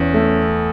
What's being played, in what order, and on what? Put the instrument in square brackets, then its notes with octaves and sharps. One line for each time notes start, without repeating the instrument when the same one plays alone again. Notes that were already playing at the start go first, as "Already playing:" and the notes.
Already playing: [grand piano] E2 [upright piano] C#4
[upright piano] A3